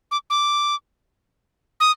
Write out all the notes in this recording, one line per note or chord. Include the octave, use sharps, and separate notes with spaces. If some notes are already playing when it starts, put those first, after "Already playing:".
D6
D6
D#6